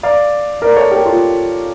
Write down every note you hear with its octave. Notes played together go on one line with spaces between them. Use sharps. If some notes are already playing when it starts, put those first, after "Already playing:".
D5 F5
A#4 D5
A4 C#5
G4 A#4
F4 A4